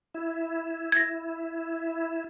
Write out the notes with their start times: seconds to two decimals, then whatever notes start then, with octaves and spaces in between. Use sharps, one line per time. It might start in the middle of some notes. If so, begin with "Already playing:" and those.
0.15 E4
0.92 G#6 A#6